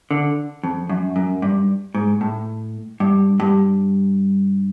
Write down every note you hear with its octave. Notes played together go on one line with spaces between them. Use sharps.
D3
F2
F#2
F#2
G2
G#2
A2
G2
G2